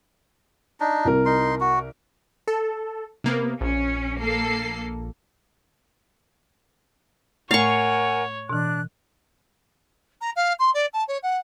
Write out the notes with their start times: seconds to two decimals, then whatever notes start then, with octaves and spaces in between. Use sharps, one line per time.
0.80 D4 D#4
1.05 C2 A#4
1.26 D#4 C6
1.60 F#4
2.48 A4
3.24 C3 A#3 B3
3.61 A#1 C#4
4.21 A#3 A4 C7
7.51 A2 A3 A#4 C#5 F5 F#5 G#5 C#6
8.49 B2 E3 D4 F#6
10.21 A#5
10.36 F5
10.59 C6
10.74 D5
10.93 A5
11.08 C#5
11.23 F#5